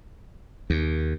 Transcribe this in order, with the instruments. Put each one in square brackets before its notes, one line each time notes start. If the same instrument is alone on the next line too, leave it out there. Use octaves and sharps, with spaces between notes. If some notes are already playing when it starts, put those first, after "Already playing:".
[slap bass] D#2